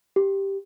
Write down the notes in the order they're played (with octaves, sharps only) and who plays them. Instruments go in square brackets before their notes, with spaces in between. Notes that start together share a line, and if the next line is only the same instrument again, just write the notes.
[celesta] G4